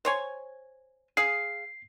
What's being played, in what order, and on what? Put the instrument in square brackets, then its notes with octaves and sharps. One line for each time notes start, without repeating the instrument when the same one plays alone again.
[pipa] C5 C#5 G#5
[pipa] G#4 F5 [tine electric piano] C7